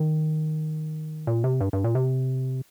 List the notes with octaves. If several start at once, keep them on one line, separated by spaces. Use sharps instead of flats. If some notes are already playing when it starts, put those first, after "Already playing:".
Already playing: D#3
A#2
C3
G2
G2
A#2
C3